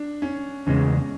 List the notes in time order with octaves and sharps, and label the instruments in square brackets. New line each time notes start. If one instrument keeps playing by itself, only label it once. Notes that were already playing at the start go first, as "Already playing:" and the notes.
Already playing: [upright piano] D4
C#4
[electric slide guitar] E2 C#3 G#3 [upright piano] C#4